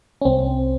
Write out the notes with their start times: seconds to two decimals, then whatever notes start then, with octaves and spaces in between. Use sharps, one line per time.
0.22 C#4
0.25 C2 C4